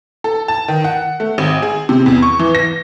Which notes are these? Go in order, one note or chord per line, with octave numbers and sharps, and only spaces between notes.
A4
A5
D#3
F#5
A3
G#1
G#4
C3
E2
C#6
E3
A#6